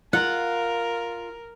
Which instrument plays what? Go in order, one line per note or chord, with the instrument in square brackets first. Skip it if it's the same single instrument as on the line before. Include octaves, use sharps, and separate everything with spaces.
[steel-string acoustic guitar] F4 [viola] A#4 [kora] F#5